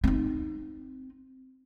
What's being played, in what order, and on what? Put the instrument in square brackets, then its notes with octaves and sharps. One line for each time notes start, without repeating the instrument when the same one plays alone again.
[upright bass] C4 D#4